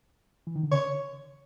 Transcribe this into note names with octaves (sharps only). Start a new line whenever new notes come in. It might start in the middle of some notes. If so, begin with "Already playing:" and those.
E3
D#3
D3
C#3 C#5